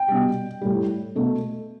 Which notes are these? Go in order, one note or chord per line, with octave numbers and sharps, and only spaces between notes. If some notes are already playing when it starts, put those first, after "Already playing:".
Already playing: G5
B2 G3
A2 G3
B2 A3